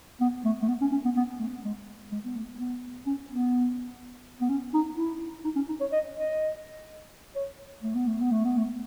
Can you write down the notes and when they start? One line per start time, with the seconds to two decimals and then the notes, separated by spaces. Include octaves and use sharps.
0.21 B3
0.45 A3
0.63 A3
0.68 B3
0.81 C#4
0.92 C#4
1.05 B3
1.16 B3
1.39 A3
1.64 G#3
2.11 G#3
2.24 B3
2.36 A3
2.59 B3
3.06 C#4
3.30 B3
4.41 B3
4.49 C#4
4.74 D#4
4.97 E4
5.44 D#4
5.56 C#4
5.69 D#4
5.80 C#5
5.92 D#5
6.16 D#5
7.36 C#5
7.83 A3
7.95 B3
8.07 A3
8.20 B3
8.32 A3
8.45 B3
8.58 A3